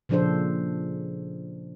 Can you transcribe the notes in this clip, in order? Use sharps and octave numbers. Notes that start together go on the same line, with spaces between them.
A#2 C#3 F3 D4 A4 C5